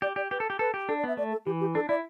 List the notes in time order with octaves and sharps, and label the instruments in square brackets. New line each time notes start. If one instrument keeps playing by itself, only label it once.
[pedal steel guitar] G4 [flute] D5
[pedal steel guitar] G4 [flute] D5
[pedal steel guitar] G4 [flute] B4
[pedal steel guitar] A4
G4
[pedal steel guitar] A4 [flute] B4
[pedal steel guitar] G4
[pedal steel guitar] D4 [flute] A4
[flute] D5
[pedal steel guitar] B3 [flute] E5
[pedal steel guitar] A3 [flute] D5
[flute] A4
[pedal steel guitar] E3 [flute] G4
[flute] G4
[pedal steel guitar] D4 [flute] A4
[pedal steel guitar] E4 [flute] D5